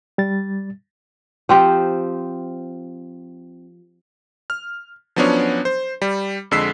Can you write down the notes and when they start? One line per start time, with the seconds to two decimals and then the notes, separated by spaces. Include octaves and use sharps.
0.18 G3 A6
1.49 F3 C4 G4
4.50 F6
5.16 F3 F#3 B3 C#4 D4 C#5
5.65 C5
6.02 G3
6.51 F2 D3 G#3 E6 B6 C7